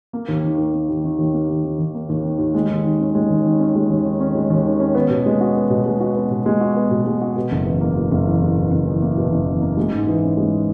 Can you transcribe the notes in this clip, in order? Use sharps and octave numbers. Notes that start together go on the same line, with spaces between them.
A#3
D#2
D#3
D#2
A#3
D#2
D#3
D#2
A#3
D#2
D#3
D#2
A#3
D#2
D#3
D#2
G#3
D#2
D#3
C#4
G#3
D#2
D#3
C#4
G#3
D#2
D#3
C#4
G#3
D#2
D#3
C#4
B3
B2
G#3
F#4
B3
B2
G#3
F#4
B3
B2
G#3
F#4
B3
B2
G#3
F#4
B2
F#1
E2
A#3
B2
F#1
E2
A#3
B2
F#1
E2
A#3
B2
F#1
E2
A#3
G#3
G#2
E3
C#4
G#3